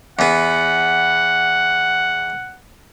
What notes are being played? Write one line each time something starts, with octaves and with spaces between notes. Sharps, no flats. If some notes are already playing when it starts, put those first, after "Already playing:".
E2 B3 F#5